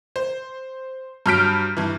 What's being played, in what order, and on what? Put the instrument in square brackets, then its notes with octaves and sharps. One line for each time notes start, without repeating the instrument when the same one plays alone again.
[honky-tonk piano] C5
G2 F#3 F6 G6 B6 D7
G2 E3